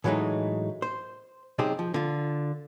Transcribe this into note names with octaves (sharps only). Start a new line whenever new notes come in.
A2 E3 F#3 G#3 A3 D#4
C5
B1 C3 C4 D#4 G4 G#4
F3
D3 F4